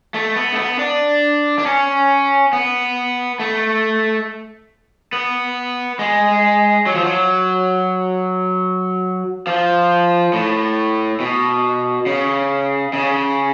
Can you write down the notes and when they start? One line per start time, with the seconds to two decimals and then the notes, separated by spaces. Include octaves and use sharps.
0.14 A3
0.36 B3
0.53 A3
0.57 B3
0.79 D4
1.59 D4
1.66 C#4
2.53 B3
3.40 A3
5.13 B3
5.99 G#3
6.86 F#3
6.95 F3
7.05 F#3
9.47 F3
10.33 A2
11.20 B2
12.06 C#3
12.93 C#3